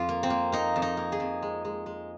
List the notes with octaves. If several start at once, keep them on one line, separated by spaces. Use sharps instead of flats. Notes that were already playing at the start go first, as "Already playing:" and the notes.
Already playing: F2 F3 F4
A#3
C4
A#3
A#3 D#4
F2
D#4
A#3
G#4
F2
G#3
G#3
G#3